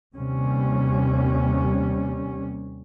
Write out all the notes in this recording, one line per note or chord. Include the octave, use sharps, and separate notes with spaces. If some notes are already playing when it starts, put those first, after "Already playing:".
D#2 C3 G3 C#4